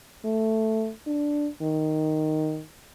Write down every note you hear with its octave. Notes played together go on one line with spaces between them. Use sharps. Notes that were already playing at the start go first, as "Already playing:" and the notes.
A3
D4
D#3